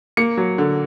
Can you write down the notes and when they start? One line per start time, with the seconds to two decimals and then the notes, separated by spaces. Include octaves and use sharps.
0.17 A#3 C#7
0.37 F#3
0.58 D3